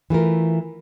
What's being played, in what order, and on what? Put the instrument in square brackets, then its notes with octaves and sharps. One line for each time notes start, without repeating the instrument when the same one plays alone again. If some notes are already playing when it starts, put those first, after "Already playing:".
[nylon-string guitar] E3 A3 F4 A#4